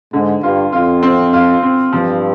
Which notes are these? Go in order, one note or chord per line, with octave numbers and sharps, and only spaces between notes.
G#2 D3
G2 F4
F2 F4
C4
F4
C4
G2 F3